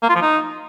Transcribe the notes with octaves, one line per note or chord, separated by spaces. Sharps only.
A#3
F4
F3
D#4